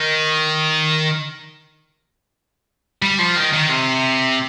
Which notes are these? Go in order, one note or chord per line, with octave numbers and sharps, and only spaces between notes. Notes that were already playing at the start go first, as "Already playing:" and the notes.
Already playing: D#3
G3
F3
D#3
D#3
C3